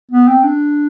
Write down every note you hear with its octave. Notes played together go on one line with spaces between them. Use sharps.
B3
C4
D4